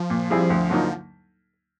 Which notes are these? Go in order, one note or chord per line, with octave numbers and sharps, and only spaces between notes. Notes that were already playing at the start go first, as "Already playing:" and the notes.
Already playing: F3
A#2
G3 C4 E4 G#4
D2
D3 F#3 A#3 D#4